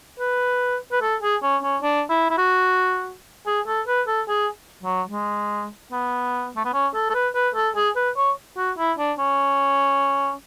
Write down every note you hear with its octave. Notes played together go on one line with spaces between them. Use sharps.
B4
B4
A4
G#4
C#4
C#4
D4
E4
E4
F#4
G#4
A4
B4
A4
G#4
F#3
G#3
B3
A3
B3
C#4
A4
A4
B4
B4
A4
G#4
B4
C#5
F#4
E4
D4
C#4